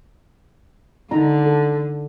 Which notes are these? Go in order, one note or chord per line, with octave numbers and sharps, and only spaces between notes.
D3 D#4 A#5
A4